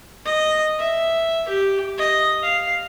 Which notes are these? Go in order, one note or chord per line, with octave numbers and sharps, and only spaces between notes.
D#5
E5
G4
D#5
F5